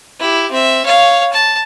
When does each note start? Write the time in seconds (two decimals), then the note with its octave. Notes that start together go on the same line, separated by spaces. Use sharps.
0.20 E4 G4
0.51 C4 E5
0.85 C#5 F5
1.33 A5